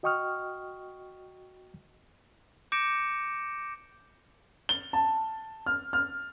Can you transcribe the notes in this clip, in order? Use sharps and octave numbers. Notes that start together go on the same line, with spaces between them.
F#4 D#5 G5 C#6 D#6 F6
D6 G6 A#6 C#7 D7 E7
G7
A5
F6
F6